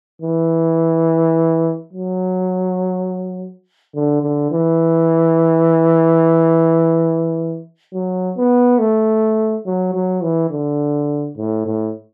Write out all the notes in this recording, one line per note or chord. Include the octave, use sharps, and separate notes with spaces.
E3
F#3
D3
D3
E3
F#3
B3
A3
F#3
F#3
E3
D3
A2
A2